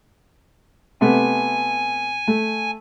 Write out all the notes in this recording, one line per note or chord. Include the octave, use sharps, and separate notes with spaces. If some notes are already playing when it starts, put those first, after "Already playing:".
C3 A3 B3 G#5
A3